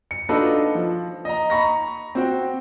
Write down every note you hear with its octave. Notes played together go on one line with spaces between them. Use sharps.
C#7
D4 D#4 F4 F#4 A4 B4
F3
D#5 A#5
A#5 B5 C#6 A#6
C4 F#4 G5